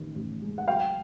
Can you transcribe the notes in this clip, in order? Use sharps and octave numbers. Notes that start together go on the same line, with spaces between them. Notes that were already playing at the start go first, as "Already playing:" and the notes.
Already playing: A1 D#3
A1
G#3
F#5
F#3 F5 G5